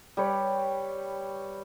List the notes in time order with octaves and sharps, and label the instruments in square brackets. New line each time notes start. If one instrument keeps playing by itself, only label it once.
[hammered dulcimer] G3 G4 B4 C#5